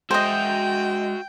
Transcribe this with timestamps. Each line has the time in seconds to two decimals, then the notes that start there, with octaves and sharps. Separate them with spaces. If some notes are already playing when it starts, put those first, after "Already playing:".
0.11 G#3 F#4 C5 D#5 E5 G5